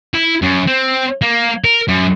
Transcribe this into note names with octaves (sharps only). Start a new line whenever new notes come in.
E4
F#2
C4
A#3
A#4
F#2